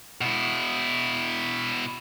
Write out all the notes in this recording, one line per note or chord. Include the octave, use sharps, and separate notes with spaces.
B2 E4